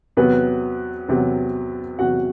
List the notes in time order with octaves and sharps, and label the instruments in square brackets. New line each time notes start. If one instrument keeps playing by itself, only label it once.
[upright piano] E2 C3 F#3 B3 B4
E2 C3 F#3
E2 C3 F#3 F#4 F#5